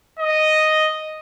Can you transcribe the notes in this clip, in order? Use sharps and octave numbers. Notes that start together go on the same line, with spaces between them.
D#5